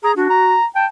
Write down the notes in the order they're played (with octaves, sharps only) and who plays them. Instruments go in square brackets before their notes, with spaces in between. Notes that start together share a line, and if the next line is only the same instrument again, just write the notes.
[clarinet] G#4 [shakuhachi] A#5
[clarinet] D4 [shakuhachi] F#4
[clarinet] A#5
[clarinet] G5 [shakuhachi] A5